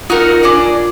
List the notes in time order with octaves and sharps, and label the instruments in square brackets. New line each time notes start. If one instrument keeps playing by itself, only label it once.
[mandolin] D#4 F#4 A#4 [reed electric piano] F4
[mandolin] D4 G#4 D5